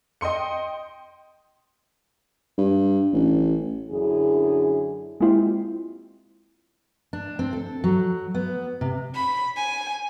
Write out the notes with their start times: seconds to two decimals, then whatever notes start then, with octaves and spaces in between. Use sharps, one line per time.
0.21 D#5 G5 C6 C#7
2.58 G2
3.13 A1
3.91 F#2 D3 E4 G#4
5.20 G#3 A#3 C4 E4 F4 G4
7.13 D4
7.39 C4
7.53 A4
7.84 F#3
8.35 B3
8.81 C3
9.15 B5
9.57 G#5